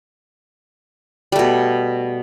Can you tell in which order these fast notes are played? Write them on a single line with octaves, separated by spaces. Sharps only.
G3 A3 B2